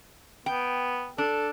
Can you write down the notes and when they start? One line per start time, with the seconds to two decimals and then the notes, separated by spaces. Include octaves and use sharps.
0.46 B3 G5
1.18 D4 A4